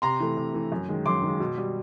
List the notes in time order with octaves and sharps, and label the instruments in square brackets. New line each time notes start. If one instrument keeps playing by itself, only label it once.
[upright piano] C3 A#5 C6
E3 A3
C3
E3 A3
F#2
D#3 G#3
F#2 C6 D6
D#3 G#3
B2
G3